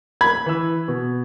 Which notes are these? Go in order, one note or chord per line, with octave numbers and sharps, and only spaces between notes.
B5 G#6
E3 E6
B2